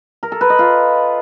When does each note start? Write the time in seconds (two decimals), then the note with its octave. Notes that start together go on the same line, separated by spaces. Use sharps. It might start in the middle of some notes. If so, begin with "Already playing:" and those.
0.23 A#4
0.32 A4
0.41 B4
0.50 D#5
0.59 F4